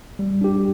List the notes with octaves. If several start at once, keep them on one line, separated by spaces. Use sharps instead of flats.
G3
D4 G4